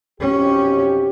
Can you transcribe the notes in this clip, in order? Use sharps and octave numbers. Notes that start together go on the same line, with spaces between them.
B1 F2 C#4 G4